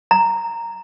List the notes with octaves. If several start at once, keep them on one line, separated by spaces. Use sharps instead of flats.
A#5